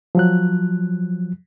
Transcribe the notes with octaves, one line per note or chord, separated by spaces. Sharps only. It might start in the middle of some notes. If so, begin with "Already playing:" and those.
F3 F#3 F#6